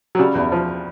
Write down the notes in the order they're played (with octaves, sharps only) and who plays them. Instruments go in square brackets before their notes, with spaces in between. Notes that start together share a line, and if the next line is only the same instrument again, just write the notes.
[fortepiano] F#3
C#3 G3
E2
F3